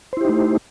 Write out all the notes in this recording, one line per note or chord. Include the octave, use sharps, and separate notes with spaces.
A3 D#4 E4 G4 C5